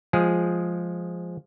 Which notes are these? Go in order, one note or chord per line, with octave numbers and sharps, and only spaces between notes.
F3 G#3 G#4